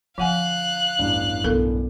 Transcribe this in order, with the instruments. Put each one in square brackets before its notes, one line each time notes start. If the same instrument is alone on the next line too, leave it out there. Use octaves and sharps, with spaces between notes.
[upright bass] D3 [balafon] F3 F#5 G#5 [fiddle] F5 F#6
[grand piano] A1 E2 G2
[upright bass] B1 [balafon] A4 A#4